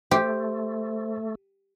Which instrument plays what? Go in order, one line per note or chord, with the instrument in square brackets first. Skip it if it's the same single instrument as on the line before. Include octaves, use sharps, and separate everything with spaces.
[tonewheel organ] A3 [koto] G4 [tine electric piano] C5